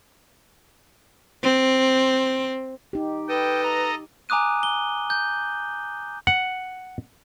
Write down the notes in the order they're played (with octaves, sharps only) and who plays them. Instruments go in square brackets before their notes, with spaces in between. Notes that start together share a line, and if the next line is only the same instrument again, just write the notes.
[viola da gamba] C4
[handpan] D#4 G4
[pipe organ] A4 D#5 [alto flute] B4 [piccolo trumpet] G5
[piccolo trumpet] A#5
[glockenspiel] G#5 A#5 D6 D#6 F#6 D#7
G7
G6
[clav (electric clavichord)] F#5